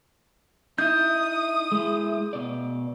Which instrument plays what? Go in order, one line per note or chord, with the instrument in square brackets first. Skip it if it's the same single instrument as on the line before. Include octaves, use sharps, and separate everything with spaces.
[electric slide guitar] D#4 E4 [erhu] D#6 [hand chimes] G6
[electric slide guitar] G#3 E4
B2 D5